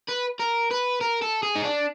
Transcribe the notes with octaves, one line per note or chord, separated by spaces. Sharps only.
B4
A#4
B4
A#4
A4
G#4
D#4
D4